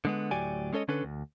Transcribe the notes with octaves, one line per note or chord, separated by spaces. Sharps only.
D3 G#3 B3
D2 A2 F#3 G4 D5 G#5
G#3 C#4 A4 C#5 D#5
D3 C#4 D4 A4 B4
D2